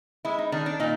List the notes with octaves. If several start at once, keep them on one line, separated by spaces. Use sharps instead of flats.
G#3 E4
D#4
D#3 D4
D4
A#2 D#4